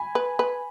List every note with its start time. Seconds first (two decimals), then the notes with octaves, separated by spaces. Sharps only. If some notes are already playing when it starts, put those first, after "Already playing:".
Already playing: G#5 B5
0.15 B4
0.39 B4